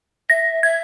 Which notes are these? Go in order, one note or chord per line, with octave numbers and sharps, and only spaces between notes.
E5 A#6
E5 G#6